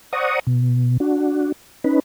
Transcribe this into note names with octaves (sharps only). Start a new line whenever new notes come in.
C5 D5 F#5 A#5 C#6 D#6
B2
D4 F#4
C#4 D#4 B4